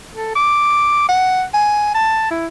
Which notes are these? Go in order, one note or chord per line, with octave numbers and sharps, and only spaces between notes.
A4
D6
F#5
G#5
A5
E4